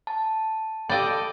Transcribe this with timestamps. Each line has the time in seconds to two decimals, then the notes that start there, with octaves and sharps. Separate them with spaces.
0.07 A5
0.90 G4 A4 D5 D#5 F5 G5 B5